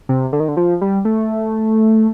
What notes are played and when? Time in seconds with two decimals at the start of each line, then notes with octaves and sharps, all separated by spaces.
0.09 C3
0.33 D3
0.40 D#3
0.48 D3
0.57 F3
0.81 G3
1.05 A3